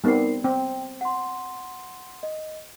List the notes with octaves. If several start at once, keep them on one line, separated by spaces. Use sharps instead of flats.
G3 B3 C4 D#4 A#4 C7
C4 G5
F#5 C6
D#5